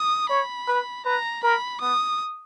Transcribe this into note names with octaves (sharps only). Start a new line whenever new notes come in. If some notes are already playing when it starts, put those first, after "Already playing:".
Already playing: D#6
C#5 B5
B4
B4 A#5
A#4 B5
B3 D#6